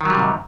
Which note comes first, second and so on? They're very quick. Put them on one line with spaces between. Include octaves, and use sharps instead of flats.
D#3 F#3 G3 C3 G#2